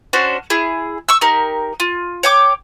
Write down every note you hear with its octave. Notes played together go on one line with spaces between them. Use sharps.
C#4 D4 F#4 C5
E4 G#4
C#6 E6
D#4 G4 A#4
F4
C#5 G5 D6